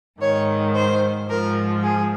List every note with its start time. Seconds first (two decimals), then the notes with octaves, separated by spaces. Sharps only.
0.20 G#2 D#3 C#5
0.75 C5
1.29 G#2 F3 A#4
1.83 G#4